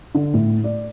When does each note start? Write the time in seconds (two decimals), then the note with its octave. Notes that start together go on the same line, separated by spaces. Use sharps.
0.15 D3
0.34 A2
0.64 D5